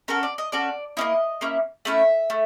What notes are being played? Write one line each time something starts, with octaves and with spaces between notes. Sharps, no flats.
C#4 F#4 A4 A#4
D5
D#5
C#4 F#4 A4 D5
A#3 C#4 E4 D#5
A#3 C#4 E4
A3 C#4 E4 E5
A3